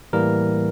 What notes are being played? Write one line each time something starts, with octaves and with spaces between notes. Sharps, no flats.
A2 E3 G3 A#3 A#4